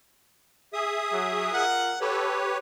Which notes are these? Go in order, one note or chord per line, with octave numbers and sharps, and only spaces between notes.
G#4 E5 D#6
F#3
F4 A#4 F#5
G4 A4 B4 C#5